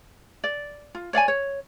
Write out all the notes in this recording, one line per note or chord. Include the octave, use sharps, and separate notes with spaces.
D5
F4
C#5 D5 F5 G#5
C#5